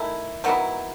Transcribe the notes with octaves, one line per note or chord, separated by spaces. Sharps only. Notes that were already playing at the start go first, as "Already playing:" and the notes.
Already playing: D#3 A3 E4
D#3 F#3 B3 E4